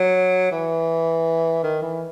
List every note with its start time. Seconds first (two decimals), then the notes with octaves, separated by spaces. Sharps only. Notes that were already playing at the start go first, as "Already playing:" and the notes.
Already playing: F#3
0.51 E3
1.63 D#3
1.82 E3